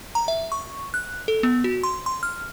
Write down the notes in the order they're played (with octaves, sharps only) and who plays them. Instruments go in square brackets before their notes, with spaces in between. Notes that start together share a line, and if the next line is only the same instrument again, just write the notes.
[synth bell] A#5
E5
C#6
F#6
A4
B3
F#4
C6
C6
F6